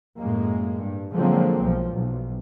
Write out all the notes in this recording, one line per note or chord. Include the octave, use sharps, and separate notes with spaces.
F#2 A2 G#3 A#3
G2
D3 F3 F#3 G#3 A#3 C4
B1 F3
B1